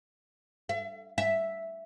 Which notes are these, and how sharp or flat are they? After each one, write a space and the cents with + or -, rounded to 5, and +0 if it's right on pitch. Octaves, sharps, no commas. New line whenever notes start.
E5 +40
E5 +0